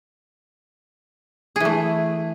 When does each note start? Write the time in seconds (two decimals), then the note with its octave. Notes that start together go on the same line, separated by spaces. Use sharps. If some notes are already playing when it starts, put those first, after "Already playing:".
1.56 G#4
1.60 E3
1.65 A3